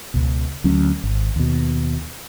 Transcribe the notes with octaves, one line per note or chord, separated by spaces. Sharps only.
C#2 B2
D2 F#3 C#4
G#1
D#2 B2